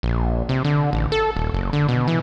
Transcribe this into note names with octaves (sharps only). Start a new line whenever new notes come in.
A#1
C3
D3
A1
A4
D#1
F#1
D3
B2
E3